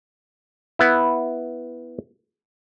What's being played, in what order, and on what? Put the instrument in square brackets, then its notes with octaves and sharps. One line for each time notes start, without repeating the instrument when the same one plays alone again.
[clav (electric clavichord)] B3 E4